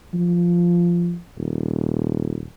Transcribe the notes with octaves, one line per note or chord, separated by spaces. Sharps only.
F3
D#1